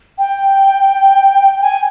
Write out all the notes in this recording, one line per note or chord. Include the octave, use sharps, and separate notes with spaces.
G5
G#5